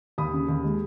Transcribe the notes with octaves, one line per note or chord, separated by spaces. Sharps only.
D#2 B5 D#6
C#3
D#2
G#3